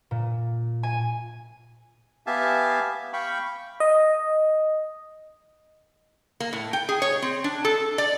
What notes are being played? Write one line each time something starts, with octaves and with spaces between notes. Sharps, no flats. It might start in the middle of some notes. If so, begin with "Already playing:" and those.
A#2
G#5
B3 G4 E5 F5 G#5 A5
F5 G5 B5 C#6
D#5
A#3
A2
G5
G#4
C#5
C4
D4
A4
D5